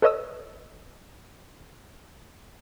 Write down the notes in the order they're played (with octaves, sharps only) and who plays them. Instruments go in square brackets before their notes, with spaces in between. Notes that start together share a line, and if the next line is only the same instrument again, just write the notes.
[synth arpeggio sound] A4 B4 C#5 D#5 D#6 E6